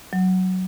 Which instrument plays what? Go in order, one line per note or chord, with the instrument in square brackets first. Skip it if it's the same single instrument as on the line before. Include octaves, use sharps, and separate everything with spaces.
[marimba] F#3